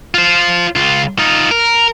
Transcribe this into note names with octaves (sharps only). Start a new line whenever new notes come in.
F4 C5
C#2 F4
D#4 F4
A#4